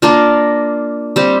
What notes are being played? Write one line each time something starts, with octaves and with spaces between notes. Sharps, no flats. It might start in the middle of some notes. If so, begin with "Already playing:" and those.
A#3 D4 F4 A#4
G3 C4 G4